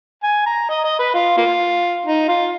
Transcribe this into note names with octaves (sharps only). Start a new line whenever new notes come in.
G#5
A#5
D#5
D#5
B4
F4
A#3 F4
D#4
F4